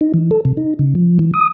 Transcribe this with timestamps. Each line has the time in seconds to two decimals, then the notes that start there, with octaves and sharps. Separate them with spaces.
0.01 D#4
0.14 E3
0.31 A4
0.45 C3
0.57 D#4
0.79 C#3
0.95 F3
1.19 E3
1.34 D#6